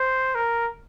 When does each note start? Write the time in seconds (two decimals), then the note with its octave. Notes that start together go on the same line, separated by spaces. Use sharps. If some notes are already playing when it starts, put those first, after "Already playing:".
Already playing: C5
0.35 A#4